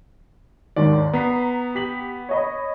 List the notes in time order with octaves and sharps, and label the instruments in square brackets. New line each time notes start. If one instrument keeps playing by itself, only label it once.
[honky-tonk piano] D#2 G#2 D#3 [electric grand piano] D5
[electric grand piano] B3 [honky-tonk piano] A#5 B6 C7
[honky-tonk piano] G4 B6 F#7
C#5 D#5 B5